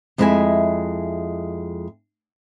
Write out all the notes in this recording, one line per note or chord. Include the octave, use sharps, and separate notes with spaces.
F2 G#3 E4 D#5 E5 G#5